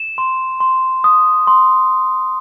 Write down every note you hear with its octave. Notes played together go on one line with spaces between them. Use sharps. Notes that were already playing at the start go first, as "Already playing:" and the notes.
Already playing: E7
C6
C6
D#6
C6